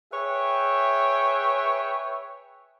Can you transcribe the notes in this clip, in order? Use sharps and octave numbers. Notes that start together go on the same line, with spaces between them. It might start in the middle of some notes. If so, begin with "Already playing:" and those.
G#4 B4 C#5 E5 G5